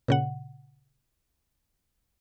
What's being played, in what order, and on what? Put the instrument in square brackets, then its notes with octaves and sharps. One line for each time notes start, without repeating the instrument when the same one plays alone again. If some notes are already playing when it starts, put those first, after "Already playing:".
[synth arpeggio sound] A#2 C#3 F#5